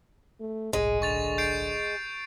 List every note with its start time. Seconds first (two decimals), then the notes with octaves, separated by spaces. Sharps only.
0.41 A3
0.73 G1 C2 A2 G#3 G#4
1.02 D3 C#6 A6 F7
1.38 G6 C7 D7